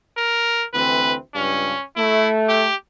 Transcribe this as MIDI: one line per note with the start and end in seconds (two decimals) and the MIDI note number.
0.17 0.65 70
0.73 1.16 38
0.73 1.16 52
0.73 1.16 60
0.73 1.14 71
1.35 1.73 37
1.35 1.73 43
1.35 1.84 61
1.96 2.68 57
1.96 2.29 64
2.49 2.75 67